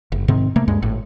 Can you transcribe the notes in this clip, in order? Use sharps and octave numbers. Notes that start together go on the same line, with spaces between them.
F#1
G#2 C3 D#3 C4
C3 A3 A#3
D2 G2 G#3
G#1 A2